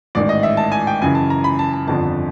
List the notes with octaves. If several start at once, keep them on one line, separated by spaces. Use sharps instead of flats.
A1 G#2 D#3 D5
D#5
E5
A5
G#5
G5
F#2 C#3 E3 G#5
A5
A#5
B5
A5
A5
G1 F2 D3 F3 A5